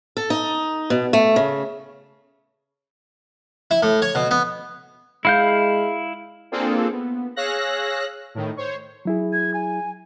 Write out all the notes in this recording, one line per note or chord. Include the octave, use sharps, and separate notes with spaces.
A4
D#4
B2
A3
C#3
E4
A2
C#5
B2
B3
G#3 E4 F5 G6
A#3 C4 D4 F4 G#4 A4
B3
G#4 C#5 F5 E6 F#6 A#6
A2 D#3
C5 C#5
F#3 E4 G#4
G#6
G#5